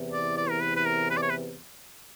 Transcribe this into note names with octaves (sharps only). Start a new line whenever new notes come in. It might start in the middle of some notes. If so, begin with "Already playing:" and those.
Already playing: E2 C3 E3
D5
D5
A#4
B4
B4
A#4
B4
D5
C#5
B4